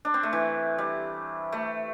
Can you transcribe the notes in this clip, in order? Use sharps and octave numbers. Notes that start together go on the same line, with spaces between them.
D4
C4
A3
E3
G3
A3